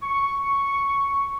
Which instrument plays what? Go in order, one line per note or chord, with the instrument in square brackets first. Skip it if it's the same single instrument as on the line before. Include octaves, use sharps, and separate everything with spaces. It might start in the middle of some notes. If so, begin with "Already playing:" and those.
[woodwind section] C#6